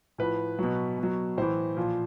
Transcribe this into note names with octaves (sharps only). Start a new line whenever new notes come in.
A2 F3 B4
B2 F#3
B2
F#3
A2 E3 C5
A#2 F3